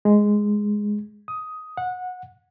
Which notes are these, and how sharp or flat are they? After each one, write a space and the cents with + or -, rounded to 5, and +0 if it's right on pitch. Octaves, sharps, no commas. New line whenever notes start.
G#3 +0
D#6 +10
F#5 -20